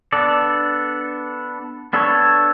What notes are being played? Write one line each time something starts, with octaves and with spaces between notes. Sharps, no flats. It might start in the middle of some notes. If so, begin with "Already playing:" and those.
B3 D4 A4 D5
B3 D4 A4 C#5